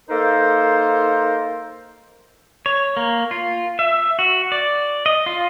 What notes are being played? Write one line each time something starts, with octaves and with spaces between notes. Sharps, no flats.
A#3 D#4 A4 A#4 C5
C#5
A#3
F4
E5
F#4
D5
D#5
F4